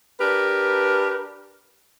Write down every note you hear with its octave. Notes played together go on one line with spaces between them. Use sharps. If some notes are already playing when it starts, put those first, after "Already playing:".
D4 G4 A#4 B4